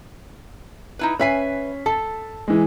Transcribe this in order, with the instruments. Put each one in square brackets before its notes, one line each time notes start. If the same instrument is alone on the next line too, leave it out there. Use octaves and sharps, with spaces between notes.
[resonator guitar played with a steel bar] D#4 E4 B4
[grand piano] C#4 B6 C7 [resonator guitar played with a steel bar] B4 E5 G#5
[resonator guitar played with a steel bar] A4 [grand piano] A5
[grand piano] E3 G#3